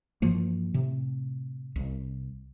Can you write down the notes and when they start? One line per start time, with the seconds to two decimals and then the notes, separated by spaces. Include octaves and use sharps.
0.22 G2 E3 F3 A#3
0.74 A2 C3
1.76 C2